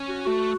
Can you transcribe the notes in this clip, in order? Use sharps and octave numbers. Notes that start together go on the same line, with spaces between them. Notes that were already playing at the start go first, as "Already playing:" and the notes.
Already playing: C#4
F#4
A3 F#4